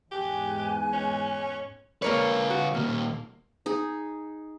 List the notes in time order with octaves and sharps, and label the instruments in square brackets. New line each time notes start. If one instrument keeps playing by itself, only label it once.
[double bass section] E2 G#2 [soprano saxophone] G4 [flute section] G#5 F#6
[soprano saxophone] C#4
[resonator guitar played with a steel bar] A#3 A#4 C#5 [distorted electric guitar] F4 B4
[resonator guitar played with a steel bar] F#4
[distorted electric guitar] D#2 A#2 [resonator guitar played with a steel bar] A#3
[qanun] D#4 G#4